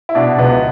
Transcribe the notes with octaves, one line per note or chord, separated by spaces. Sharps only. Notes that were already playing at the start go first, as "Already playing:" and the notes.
E4
B2 D4
C#2 B3